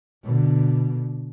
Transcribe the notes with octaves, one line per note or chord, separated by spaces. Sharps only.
B2 D3